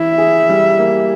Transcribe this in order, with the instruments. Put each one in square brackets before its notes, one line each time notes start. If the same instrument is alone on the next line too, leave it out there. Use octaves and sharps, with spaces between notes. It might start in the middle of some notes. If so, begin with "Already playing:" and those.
Already playing: [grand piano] E3 E4 [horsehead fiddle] E5
[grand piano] G#4
G3
A#3